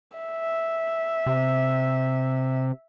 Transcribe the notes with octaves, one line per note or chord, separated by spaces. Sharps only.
E5
C3